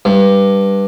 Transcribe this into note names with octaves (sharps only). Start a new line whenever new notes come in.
G2